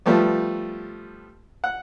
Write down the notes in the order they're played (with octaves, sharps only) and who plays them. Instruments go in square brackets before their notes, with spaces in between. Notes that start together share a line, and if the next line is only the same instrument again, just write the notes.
[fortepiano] F3 G3 A3 B3
F#5